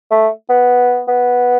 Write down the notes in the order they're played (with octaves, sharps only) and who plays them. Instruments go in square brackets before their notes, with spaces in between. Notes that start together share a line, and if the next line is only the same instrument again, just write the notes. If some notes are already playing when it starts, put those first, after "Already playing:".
[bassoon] A3
B3
B3